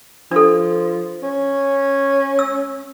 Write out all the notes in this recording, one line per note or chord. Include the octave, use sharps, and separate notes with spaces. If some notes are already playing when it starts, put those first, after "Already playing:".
F3 D4 A4
C#4
E6